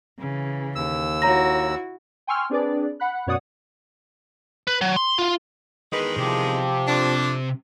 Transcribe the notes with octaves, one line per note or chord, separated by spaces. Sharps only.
C#3 E3
D#2 E6
E4 F#4 C#5 A#5 A#6
G5 G#5 C6 C#6 E6 F6
C4 D4 G#4 B4 D5
F#5 B5 F#6
F#2 B2 C#5 D5 F#5 D#6
B4
F#3
C6
F4
E2 D#3 G#3 B4
C3 F3 G4
F2 D4